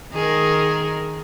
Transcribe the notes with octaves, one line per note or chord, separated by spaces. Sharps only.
D#3 G#4 A#4